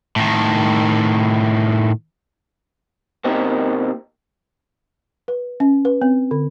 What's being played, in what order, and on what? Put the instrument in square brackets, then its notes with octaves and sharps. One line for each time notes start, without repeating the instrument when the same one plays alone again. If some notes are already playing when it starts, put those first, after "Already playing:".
[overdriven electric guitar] A2 D#3
[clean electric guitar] B2 A#3 C4 D#4 G4 A#4
[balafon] B4
C#4
B4
C4
D3